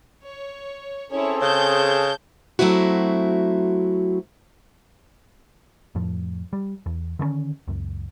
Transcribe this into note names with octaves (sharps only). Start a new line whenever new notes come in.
C#5
C4 C#4 E4 G#4 A4 C#5
C#3 A5 G6
F#3 A3 C4 E4 F#4
F2 A2 F3
G3
E2
D3 D#3 G#3 C#4
C#2 F#2